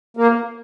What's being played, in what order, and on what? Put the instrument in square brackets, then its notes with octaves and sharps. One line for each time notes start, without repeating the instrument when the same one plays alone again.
[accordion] A#3